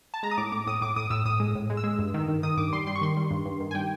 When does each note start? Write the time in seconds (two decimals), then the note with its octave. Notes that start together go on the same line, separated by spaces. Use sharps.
0.14 A5
0.23 G#3 A#5
0.31 D#6
0.37 A2 D6
0.52 A2 D6
0.67 A2 D#6
0.81 A2 D6
0.96 A2 D#6
1.10 A2 E6
1.25 A2 D#6
1.40 G#3
1.55 A2
1.70 G#3
1.77 E6
1.84 G#3
1.99 G2
2.14 D#3
2.28 D#3
2.43 D#3 D#6
2.57 G2 D6
2.72 G3 C6
2.87 G3 C6
2.96 C#6
3.01 D#3 C6
3.17 G3
3.31 G2
3.46 G2
3.60 D#3
3.71 G#5
3.75 G3 G5